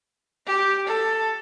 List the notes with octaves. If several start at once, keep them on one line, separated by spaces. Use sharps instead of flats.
G4
A4